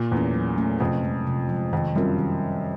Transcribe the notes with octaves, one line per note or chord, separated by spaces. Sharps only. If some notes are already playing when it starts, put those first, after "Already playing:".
Already playing: A#2
E2 A3 C#4
F#3
A3 C#4
F2 C3
F3 G#3
C3
F3
G#3
F2 D#3
F#2 G3 C4 F4 A#4
D#3